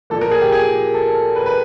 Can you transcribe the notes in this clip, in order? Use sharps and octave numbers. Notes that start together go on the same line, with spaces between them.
A#2 F3 A#3 A4
A#4
G#4
G4
G#4
A4
B4
B4